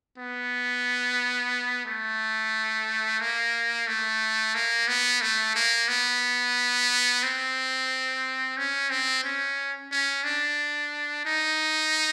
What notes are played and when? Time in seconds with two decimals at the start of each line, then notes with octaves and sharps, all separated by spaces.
0.18 B3
1.86 A3
3.20 A#3
3.87 A3
4.55 A#3
4.88 B3
5.22 A3
5.56 A#3
5.88 B3
7.23 C4
8.58 C#4
8.90 C4
9.24 C#4
9.91 C#4
10.24 D4
11.26 D#4